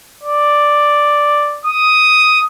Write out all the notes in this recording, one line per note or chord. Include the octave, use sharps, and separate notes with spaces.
D5
D#6